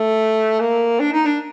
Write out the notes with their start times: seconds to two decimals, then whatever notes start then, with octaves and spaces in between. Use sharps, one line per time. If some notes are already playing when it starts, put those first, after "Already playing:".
Already playing: A3
0.60 A#3
1.00 D4
1.12 D#4
1.25 D4